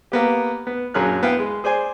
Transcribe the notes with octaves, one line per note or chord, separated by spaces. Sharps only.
A#3 B3 G4
B3
A#1 F#2 F#3 G#4 F6 F#6
B3 E4 F5 G5
G#3
G#4 C5 D5 G#5